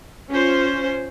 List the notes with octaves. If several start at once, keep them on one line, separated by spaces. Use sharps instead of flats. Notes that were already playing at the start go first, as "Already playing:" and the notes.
C#4 F4 C5